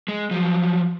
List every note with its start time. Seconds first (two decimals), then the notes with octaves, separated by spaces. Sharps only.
0.08 G#3
0.31 F3 F#3